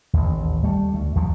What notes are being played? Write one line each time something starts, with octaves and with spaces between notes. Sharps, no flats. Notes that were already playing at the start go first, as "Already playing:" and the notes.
A1 D#2
G3 A3
D2
D#2 F3 F#3